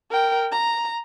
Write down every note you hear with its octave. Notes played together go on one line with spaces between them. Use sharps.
A#4 G5
A#5